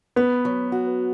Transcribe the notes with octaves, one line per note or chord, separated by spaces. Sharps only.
B3 B4
F#3
F#4